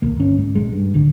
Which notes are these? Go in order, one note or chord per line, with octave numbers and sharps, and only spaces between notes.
D#1 C2 A#3
G1 C#4
G#2
A#1 G#3
G2
D1 G#1 D3